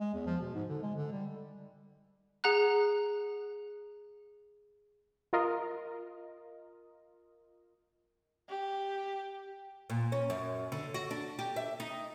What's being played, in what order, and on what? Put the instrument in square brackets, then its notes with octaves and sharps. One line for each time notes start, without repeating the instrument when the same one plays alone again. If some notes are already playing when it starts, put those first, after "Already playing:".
[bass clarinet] G#3
E2
F3
B2
G#2
D3
G#3
D3
G3
[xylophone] G#4 F#5 A#5 F#6
[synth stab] F4 A#4 D#5
[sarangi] G4
[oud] A#2
C#4
F#2
D3
F#4
D4
G4
E5
D#4